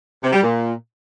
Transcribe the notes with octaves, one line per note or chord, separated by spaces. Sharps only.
C3
G3
A#2